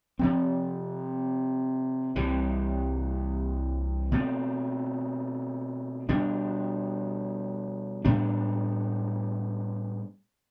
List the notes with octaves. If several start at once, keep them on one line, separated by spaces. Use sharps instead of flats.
C3 F3 C4
C2 C3 E3 G3
B2 A3 C4
B2 G3 D4
A2 G3 B3 D4